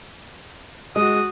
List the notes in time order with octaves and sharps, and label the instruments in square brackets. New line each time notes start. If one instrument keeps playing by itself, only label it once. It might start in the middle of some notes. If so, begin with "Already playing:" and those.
[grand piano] G#3 [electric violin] F#4 D#6